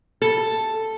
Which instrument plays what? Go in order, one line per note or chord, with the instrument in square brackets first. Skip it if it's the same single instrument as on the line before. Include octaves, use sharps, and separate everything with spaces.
[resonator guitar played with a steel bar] A4